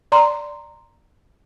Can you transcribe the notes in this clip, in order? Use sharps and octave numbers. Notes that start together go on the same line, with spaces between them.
D5 A#5 C6